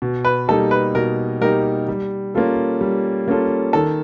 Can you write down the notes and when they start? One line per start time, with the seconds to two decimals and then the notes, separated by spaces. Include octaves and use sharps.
0.02 B2
0.25 B4
0.48 G3 A#3 D#4 G4 A4
0.71 B4
0.95 B2 A#4
1.41 G3 A#3 D#4 G4 A#4
1.88 G3
2.34 A#3 C#4 F4 A4
2.81 G3
3.28 A#3 C#4 F4 A4
3.73 D#3 A4